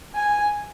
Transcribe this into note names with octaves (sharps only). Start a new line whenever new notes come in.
G#5